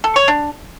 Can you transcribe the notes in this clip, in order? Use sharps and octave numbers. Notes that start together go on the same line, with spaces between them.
A4
C#5
D4